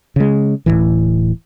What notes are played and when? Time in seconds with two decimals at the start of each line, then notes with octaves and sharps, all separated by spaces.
0.16 C#3 G#3
0.66 D1 C2 A2 E3